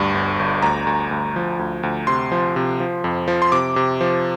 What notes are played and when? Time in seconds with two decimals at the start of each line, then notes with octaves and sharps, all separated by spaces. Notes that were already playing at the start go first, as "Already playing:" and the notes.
Already playing: D2 G2
0.14 G1
0.39 G1
0.62 D2 A#5
0.87 D2
1.11 D2
1.36 F3
1.59 D2
1.83 D2
2.07 C3 C6
2.32 F3
2.56 C3
2.80 F3
3.04 F2
3.28 F3
3.42 C6
3.52 C3 D6
3.76 C3
4.01 F3